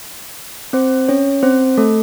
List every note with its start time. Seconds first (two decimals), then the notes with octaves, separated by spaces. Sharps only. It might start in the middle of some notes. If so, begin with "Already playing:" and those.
0.73 C4 C5
1.08 C#4 C#5
1.43 C4 C5
1.77 A3 A4